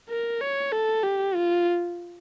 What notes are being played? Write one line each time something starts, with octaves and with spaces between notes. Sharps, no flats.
A#4
C#5
A4
G4
F4